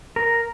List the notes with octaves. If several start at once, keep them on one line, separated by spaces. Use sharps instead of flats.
A#4